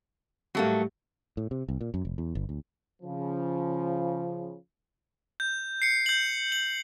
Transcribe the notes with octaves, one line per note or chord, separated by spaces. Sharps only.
A2 F#3 G3 A3 A#3
A2
C3
C2
A#2
F#2
F1
E2
G1
D2
C#3 F3
G6
C7 C#7
G6 F#7
F#7